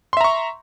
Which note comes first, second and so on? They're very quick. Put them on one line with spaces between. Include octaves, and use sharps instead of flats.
C6 E5 A#5 C#6